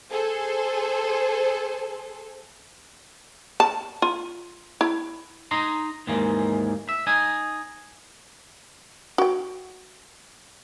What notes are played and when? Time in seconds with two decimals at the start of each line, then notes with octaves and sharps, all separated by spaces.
0.11 G#4 A4 C5
3.60 A5
4.02 F4
4.81 E4
5.51 D#4 D#5 A#5 C6
6.07 D#2 G#2 E3 G#3 A#3
6.89 E5
7.07 D#4 D#5 G#5
9.18 F#4 G5